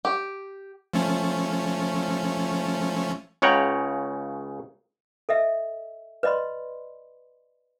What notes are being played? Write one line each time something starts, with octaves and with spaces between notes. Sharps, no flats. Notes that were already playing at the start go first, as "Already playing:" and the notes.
G4
F3 A3 C#4
C#2 C#3 C#5 F#5 G5 A#5
A4 D#5 E5
B4 D5 D#5 B5 C6